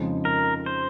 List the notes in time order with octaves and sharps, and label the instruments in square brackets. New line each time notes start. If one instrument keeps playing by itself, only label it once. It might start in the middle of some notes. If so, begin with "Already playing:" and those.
Already playing: [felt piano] F2 C#3 F3 G#3 D#4
[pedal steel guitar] A#4
C5